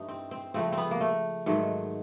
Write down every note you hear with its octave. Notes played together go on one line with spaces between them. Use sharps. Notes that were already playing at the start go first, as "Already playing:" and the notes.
Already playing: G2 E3 A3 D#4
C4
C4
C#3 F3 A3 C4
B3 C4
A#3
A3
G#2 D#3 F#3 A3